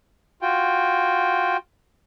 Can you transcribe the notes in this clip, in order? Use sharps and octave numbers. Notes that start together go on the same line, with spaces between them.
F4 F#4 G5